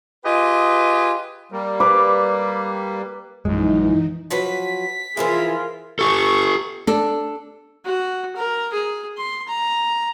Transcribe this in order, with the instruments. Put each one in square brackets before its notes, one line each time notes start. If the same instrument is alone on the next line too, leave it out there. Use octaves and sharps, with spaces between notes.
[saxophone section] F4 G4 G#4 B4 D#5
[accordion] G3 A#3
[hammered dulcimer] B4 D6
[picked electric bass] A#1 G#3 [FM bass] F#2 [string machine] E3 D#4
[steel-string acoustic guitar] F3 F#3 B4 [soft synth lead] B6
[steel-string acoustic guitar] E3 F3 E4 [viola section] F4 G#4 [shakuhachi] A#4
[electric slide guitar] G4 A4 [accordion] C#6
[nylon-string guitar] D4 A4
[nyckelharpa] F#4
A#4
G#4
C6
A#5